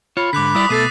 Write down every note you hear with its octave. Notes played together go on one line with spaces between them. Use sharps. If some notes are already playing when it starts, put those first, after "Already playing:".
F4 C#5 B5
G#2 D3 D6 F#6 B6
G3 E4 D5 D#6 B6
B2 A3 B3 A4 A6 C7 D#7